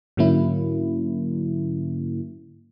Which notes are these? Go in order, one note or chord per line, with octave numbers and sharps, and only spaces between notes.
G#2 D3 F#3 A#3 C#4 E4